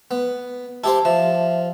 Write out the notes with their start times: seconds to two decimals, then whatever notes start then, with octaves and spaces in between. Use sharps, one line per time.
0.11 B3
0.84 E4 G4 C5 A5
1.05 F3 E5